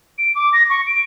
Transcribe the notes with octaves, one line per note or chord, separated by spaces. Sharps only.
D7
D6
A#6
C#6
D7